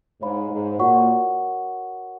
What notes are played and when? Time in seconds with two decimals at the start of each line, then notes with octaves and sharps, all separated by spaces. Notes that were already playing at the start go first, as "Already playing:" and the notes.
0.21 G#2 C#5 F5 B5
0.50 G#2
0.79 A#2 F#4 A#4 C#5 F#5 C#6